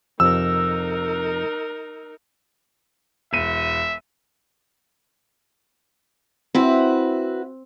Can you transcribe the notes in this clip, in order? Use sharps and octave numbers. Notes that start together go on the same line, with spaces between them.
F2 C3 D#4 A#4 E6
E1 E5 D#7
C4 E4 F#4 B4